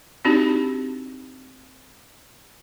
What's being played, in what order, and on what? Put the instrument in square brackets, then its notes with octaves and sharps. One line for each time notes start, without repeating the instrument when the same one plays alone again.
[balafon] C4 D4 D#4 F#4 G4